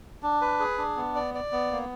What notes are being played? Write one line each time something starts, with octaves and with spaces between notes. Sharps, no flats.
D4
B4
G#4
D4
B3
D5
D5
B3
A#3